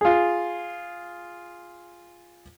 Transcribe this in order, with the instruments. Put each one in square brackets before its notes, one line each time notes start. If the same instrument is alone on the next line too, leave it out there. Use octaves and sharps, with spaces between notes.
[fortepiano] F4 G#4